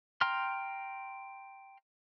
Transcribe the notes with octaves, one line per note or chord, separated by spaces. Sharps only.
G5 A#5 C6 F6